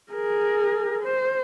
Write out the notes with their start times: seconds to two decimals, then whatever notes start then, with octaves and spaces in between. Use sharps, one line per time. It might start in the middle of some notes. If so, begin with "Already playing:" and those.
0.12 G#4 A#4
1.03 C5